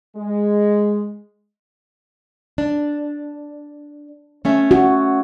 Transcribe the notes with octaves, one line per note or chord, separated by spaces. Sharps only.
G#3
D4
A3 C#4 E5
F#4